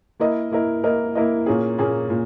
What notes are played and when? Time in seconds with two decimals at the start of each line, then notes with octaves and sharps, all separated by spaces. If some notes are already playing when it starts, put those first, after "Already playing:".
0.20 A#3 E4 A#4 D#5
0.52 A#3 E4 A#4 D#5
0.83 A#3 E4 A#4 D#5
1.15 A#3 E4 A#4 D#5
1.46 A#2 A#3 C#4 G#4
1.78 A#2 A#3 C#4 G#4
2.10 A#2